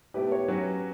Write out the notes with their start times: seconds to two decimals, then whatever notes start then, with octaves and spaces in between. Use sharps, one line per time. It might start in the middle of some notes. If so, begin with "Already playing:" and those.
0.14 B2 A3 E4 G4 B4
0.32 C#5
0.48 F#3 C#4 F#4 B4 C#5